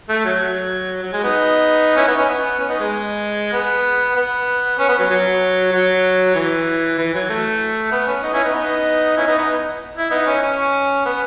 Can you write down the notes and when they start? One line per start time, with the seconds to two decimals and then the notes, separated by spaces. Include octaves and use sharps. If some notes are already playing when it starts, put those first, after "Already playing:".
0.09 A3
0.25 F#3
0.40 F#3
1.02 F#3
1.13 G#3
1.24 B3 D#4
1.96 C#4 E4
2.07 B3 D#4
2.18 C#4
2.28 B3
2.59 C#4
2.69 B3 D#4
2.80 G#3
3.53 B3
4.16 B3
4.79 C#4
4.89 B3
4.99 F#3
5.10 F#3
5.72 F#3
6.35 E3
6.98 E3
7.14 F#3
7.29 A3
7.92 B3
8.07 C#4
8.23 B3 D#4
8.33 C#4 E4
8.43 B3 D#4
8.54 B3 D#4
9.17 C#4 E4
9.27 B3 D#4
9.37 B3 D#4
9.97 E4
10.11 B3 D#4
10.26 C#4
10.42 C#4
11.05 B3